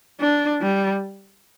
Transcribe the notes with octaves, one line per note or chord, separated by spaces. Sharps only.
D4
G3